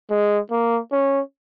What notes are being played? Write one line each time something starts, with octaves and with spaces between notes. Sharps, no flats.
G#3
A#3
C#4